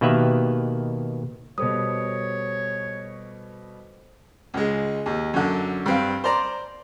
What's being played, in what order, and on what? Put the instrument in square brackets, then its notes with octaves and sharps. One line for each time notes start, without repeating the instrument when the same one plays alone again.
[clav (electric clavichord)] B2 D#3 A#3 G4 B4 E5
[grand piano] B2 G3 [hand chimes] A4 C5 D#6 [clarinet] C#5
[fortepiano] C#2 G#3
D#2
F#2 D3
G2 C4 F5
C5 D5 A#5 C6